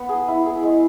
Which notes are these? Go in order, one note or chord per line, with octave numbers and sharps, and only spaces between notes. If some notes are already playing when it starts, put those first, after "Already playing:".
Already playing: B3
G#4
E4
G#4
G#3